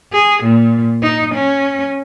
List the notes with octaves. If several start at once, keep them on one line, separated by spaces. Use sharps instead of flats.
G#4
A#2
D#4
C#4